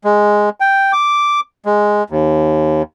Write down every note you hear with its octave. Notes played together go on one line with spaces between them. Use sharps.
G#3
G5
D6
G#3
D#2